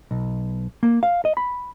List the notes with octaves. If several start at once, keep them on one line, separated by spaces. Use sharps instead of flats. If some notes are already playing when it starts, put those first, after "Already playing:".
B1
A#3
F5
D#5
B5